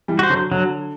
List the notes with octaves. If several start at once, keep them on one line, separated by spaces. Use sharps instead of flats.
E3 G3
F#4 C5
D3 F#3
D3 F#3